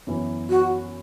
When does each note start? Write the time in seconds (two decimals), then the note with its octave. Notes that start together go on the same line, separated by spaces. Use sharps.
0.07 F#2 E3 B3
0.50 F#4